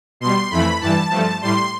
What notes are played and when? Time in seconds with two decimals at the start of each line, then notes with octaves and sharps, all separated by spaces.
0.20 B2 G3 C6
0.51 F2 E3 A3 B5
0.81 G2 E3 G3 A5
1.10 G2 F3 A3
1.42 A2 G3 C6